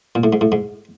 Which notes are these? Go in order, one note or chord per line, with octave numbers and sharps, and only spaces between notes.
A#2
A2
G#2
A2
G#2